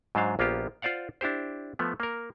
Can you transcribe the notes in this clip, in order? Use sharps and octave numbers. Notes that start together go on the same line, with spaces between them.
G#2 F#3 D4 C5 F5
A#1 A#3 B3 F4 G4
F4 C5 D5 F5 F#5
D4 E4 G4 C5
F3 A3 B3
A#3 A#4